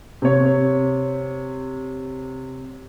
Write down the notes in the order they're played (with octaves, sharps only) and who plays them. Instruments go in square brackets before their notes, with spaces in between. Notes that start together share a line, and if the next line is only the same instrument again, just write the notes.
[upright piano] C3 C#5